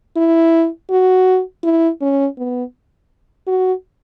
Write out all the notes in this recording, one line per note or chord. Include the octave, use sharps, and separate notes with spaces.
E4
F#4
E4
C#4
B3
F#4